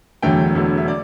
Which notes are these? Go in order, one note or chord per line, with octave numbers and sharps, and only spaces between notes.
E1 E2 D3 F#3 A3 G5
E1 E2 D3 F#3 A3
E5
D5